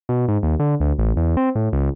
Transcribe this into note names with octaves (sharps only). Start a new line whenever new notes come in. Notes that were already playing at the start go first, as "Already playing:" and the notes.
B2
G#2
D#2
D3
D2
A1
E2
C4
A2
C#2